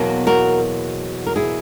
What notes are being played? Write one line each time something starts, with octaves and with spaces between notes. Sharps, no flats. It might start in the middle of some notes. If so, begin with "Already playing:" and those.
Already playing: E2 B2 F#3 A#3
F#4 A#4
A#4
E4 G#4